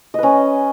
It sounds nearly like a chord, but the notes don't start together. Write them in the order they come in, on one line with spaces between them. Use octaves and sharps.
D#5 B4 C#4